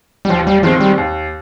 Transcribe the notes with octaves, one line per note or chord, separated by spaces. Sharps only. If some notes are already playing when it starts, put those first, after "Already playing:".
G3
D#2 F3
G3
D#3 F3 G#3 C4
G3
D#2